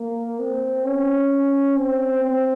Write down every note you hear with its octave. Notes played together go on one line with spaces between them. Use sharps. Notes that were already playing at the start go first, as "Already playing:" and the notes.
Already playing: A#3
C4
C#4
C4
C4